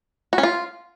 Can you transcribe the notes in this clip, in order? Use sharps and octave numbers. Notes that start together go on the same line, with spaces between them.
F#4
C#4
F4